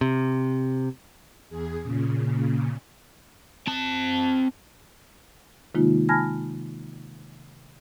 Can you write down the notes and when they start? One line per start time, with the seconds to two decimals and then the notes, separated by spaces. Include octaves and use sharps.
0.01 C3
1.49 E2 G#4
1.82 A#2 C#3
3.67 C4 A5
5.75 C3 D#3 G#3 A#3 D#4 F4
6.09 G#5 A5 B5 F6 G#6 A#6